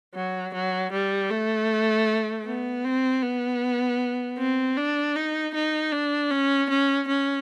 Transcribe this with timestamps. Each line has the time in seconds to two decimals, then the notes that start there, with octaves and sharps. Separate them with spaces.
0.15 F#3
0.54 F#3
0.92 G3
1.30 A3
2.46 B3
2.85 C4
3.23 B3
4.38 C4
4.77 D4
5.16 D#4
5.55 D#4
5.92 D4
6.30 C#4
6.70 C#4
7.08 C#4